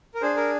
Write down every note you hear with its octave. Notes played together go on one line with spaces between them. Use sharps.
A#4
D4 G#4 C5
A#4